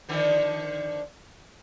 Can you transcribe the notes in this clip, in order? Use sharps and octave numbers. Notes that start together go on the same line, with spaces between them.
D3 D#3 F3